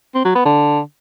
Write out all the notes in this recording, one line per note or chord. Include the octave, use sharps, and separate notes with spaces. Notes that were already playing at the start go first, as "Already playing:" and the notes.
C4
F#3
B3
D3